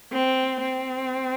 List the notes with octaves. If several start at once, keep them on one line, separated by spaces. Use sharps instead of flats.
C4
C4